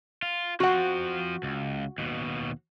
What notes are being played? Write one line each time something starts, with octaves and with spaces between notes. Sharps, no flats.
F4
F3 C4 F#4 F#5
C#2
D#2 B2